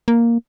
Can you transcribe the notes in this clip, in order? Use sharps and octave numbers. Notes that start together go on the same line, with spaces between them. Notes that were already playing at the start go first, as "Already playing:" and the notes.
A#3